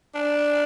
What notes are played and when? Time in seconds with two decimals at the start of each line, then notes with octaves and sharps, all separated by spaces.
0.15 D4